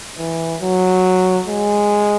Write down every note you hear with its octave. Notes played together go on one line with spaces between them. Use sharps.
E3
F#3
G#3